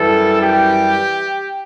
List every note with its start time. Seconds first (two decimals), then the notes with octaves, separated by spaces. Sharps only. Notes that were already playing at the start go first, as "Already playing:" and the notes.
Already playing: F#2 E3 G3 A4
0.42 G4